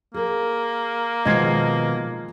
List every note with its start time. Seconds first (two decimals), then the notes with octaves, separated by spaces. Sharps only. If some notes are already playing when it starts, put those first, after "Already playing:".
0.14 A#3 G#4 A#4
1.25 B2 D#3 F3 G#3 D#5 C6 G#6 C7